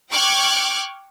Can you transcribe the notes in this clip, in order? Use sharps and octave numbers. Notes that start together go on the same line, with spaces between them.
G5 C#6 D6 F6 F#6 G#6